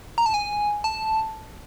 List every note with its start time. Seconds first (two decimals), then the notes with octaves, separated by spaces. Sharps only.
0.18 A#5
0.26 A5
0.34 G#5
0.84 A5